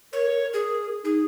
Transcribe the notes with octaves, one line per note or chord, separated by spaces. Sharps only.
A#4 C#5
A#4
G#4
D#4 G#4